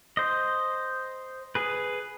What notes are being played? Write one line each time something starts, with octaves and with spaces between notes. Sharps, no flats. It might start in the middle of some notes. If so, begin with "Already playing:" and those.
C5 D#5
G#4 B4